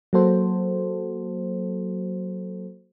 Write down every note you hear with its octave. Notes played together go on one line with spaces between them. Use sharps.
F#3 A#3 F#4 A4 C5